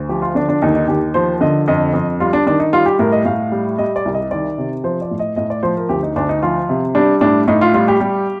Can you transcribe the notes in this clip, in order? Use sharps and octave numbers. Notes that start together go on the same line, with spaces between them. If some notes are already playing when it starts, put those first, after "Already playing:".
Already playing: D2
F3 G4
F4
D3 D4
D4
D#2 D#4
D#4
D#2 G4
F3 C5
D3 D#5
F2 D#5
F2
G3 F4
D4
D#3 D4
D#4
G3 F4
G4
A2 A#4
D#5
A2 F5
G3
G3 D#5
D5
C2
D#5
D#3 D5
C3
F3 C5
D5
A2
D#5
A2 D#5
D5
F3 C5
A#4
D2 G4
D#4
D2 D4
D#4
F3 F4
C3
G3 D4
A2 D4
A2 D#4
F4
G3 F4
G4
G3